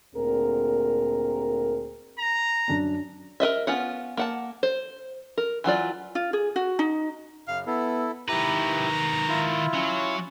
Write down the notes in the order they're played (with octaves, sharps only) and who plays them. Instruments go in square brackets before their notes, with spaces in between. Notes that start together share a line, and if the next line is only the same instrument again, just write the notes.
[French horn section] D2 A#2 C4 G#4 A#4
[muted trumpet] A#5
[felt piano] F#2 D4
[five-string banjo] A#4 B4 D#5 E5
B3 C#4 F4 F#5
A#3 F#5 A5
C5
A#4
E3 F#3 F4 D5
[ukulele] F4
G#4
F#4
D#4
[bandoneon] F#2 C#3 [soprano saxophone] F5
[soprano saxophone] B3 [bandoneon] E4 A4
[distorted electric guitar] D#3 B4 [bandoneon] E4 G4 [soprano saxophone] A#5
[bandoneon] E4 F4
[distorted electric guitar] F#3 [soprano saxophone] C#4